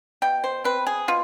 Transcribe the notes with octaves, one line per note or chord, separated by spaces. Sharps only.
B2 G5
C5
C4 B4
G#4
B2 F4